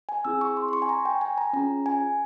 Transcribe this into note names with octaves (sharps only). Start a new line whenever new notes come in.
G#5
C4 E4 G#4 E6
C#6
C6
C6
C#6
G#5
A#5
G5
G#5
A#5
C#4 F4 G#4 A#5
G#5